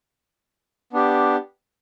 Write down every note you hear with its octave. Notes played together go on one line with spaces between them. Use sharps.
B3 D4 G4